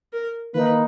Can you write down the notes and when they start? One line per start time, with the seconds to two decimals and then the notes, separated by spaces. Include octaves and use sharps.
0.13 A#4
0.54 D#3 A#3 D#4 B4